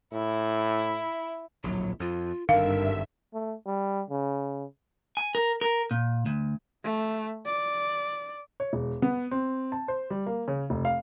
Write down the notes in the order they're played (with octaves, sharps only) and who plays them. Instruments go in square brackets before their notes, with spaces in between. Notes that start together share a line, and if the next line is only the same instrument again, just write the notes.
[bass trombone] A2 [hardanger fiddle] E4
[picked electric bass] D1 A#1 [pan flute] F#3
[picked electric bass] F2 [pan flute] F4
[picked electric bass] G#1 D3 D#3 [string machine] G2 E5 [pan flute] A#4 [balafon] F5
[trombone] A3
G3
C#3
[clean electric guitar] G#5
A#4
A#4
A#2
D2
[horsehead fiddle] A3
D5
[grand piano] C#5
E1
B3
C4
A5
C5
G3
A#3
C#3
F1
F5